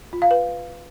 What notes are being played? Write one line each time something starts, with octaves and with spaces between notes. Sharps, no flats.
F4
F5
B4